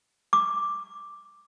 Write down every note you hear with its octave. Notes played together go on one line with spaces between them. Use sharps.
D6